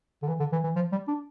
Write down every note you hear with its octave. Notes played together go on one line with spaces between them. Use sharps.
D3
E3
D3
E3
E3
F3
G3
D4